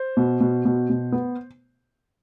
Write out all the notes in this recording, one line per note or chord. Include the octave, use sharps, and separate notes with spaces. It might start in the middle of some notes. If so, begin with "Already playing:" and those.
Already playing: C5
B2
B2
B2
B2
B3